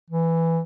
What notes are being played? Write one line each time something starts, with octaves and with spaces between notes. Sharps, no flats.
E3